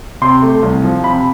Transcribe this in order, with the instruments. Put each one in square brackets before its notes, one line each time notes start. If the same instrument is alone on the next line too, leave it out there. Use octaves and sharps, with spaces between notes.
[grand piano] C3 C6
A3
C2
F3
C3 B5